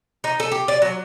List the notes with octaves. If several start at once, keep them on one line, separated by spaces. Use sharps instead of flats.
D#4
A4
G4
D5
F#3